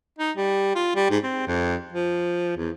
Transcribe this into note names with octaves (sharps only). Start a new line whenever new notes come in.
D#4
G3
F4
G3
G#2
C4
F2
F3
E2